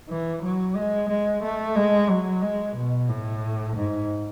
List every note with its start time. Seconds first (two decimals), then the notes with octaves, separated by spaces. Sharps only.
0.09 E3
0.42 F#3
0.76 G#3
1.09 G#3
1.43 A3
1.76 G#3
2.09 F#3
2.42 G#3
2.76 B2
3.09 A2
3.76 G#2